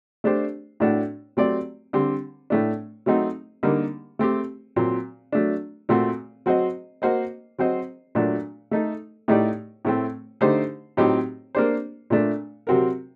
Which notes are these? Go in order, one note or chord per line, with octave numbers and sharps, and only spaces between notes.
A3 D4 G4 C5
A2 A3 D4 F#4
F#3 A3 C4 G4 D5
D3 G3 C4 G4
A2 A3 D4
F#3 A3 C4 D#4 F#4
D3 G3 A#3 D#4
A3 C4 G4
A#2 F#3 C4
F#3 A3 D4
A#2 A3 C4 F#4
F#3 C4 F#4 C5 D#5
A#3 F#4 C5 D#5
F#3 C4 F#4 C5 D#5
A#2 F#3 A3 D4 F#4
A3 D#4 A4
A2 A3 D#4 G4 D5
A2 A3 C4
D3 A3 D#4 G4 C5
A2 F#3 C4 D#4 G4
A#3 D4 G4 C5
A#2 A3 D4
C3 F#3 C4 F#4 A#4